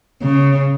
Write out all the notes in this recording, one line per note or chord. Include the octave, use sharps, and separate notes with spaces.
C#3